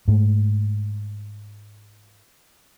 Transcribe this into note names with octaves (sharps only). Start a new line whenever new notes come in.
G#2 A3